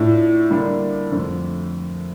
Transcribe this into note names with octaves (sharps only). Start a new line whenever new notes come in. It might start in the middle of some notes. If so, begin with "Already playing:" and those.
Already playing: A2 A3 D4 F4
D3 G3 A#3 D4
F2 D3 A3